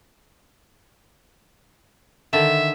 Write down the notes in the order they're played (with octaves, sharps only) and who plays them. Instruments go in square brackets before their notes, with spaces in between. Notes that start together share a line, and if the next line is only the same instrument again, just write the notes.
[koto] D3 D#3 [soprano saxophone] E5